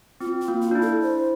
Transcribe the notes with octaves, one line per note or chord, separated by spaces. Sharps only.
C4 F4
F4
A#3
F4
D4
E4
A4
C5